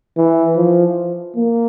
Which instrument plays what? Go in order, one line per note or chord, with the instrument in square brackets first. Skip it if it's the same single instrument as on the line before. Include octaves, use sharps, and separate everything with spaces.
[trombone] E3
F3
A#3